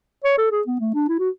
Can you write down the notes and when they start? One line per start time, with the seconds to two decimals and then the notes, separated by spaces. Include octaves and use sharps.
0.24 C#5
0.37 A4
0.51 G#4
0.67 B3
0.80 A3
0.94 D4
1.09 E4
1.19 F#4